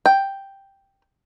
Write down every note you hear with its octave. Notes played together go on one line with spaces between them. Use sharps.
G5